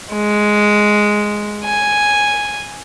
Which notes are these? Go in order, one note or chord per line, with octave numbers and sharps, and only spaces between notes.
G#3
G#5